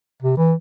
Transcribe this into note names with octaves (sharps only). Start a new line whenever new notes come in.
C3
E3